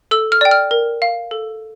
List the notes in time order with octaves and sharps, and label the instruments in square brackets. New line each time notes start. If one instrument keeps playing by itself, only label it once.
[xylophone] A4 E6
F6
D5 G5
F6
A#4
F5
A4